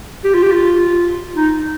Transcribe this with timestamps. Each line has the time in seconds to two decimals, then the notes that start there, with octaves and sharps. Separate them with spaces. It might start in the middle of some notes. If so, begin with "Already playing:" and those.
0.24 G4
0.34 F4
0.43 G4
0.52 F4
1.36 D#4